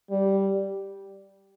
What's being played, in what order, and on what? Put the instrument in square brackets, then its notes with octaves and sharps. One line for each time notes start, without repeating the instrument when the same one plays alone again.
[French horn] G3